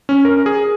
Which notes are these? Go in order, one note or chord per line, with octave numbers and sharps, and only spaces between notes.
C#4
A#4
G#4